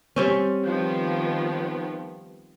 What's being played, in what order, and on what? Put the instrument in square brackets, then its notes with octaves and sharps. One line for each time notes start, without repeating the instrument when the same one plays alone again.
[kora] G3 C4 C#4
[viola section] D#3 F3 B3